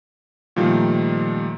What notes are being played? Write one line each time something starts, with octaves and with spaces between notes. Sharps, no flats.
A#2 D#3 F3 G3 A3